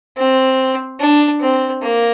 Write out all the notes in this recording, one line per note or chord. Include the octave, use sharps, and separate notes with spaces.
C4
D4
C4
A#3